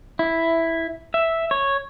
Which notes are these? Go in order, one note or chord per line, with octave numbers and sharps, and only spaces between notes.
E4
E5
C#5